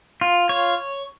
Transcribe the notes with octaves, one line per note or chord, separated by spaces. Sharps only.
F4
C#5